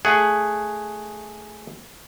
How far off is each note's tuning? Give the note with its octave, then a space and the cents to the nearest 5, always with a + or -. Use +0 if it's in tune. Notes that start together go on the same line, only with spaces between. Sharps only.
A3 +0 G#4 +0 F#5 +10